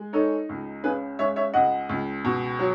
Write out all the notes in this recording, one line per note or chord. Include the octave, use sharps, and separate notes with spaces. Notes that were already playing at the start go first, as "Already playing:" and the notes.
Already playing: G#3
D#4 A4 C#5
C#2
C#3 G#4 B4
G#3 C#5 E5
C#5 E5
C#2 D#5 F#5
C#2
B2
F#3